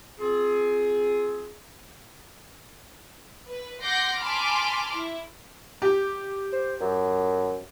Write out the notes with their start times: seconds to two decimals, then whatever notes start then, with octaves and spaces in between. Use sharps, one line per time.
0.20 C4 F4 G#4
3.51 B4
3.83 F#5 C6 D6 G6 A#6 C7
4.21 G#5 A5 B5 C6 D6 F6
4.95 E4
5.82 G4
6.53 C5
6.80 F#2